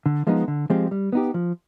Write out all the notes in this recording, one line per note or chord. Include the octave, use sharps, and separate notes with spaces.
D3
F3 G#3 B3 D#4
D3
F3 G#3 C4 G4
G3
B3 D#4 G4
F3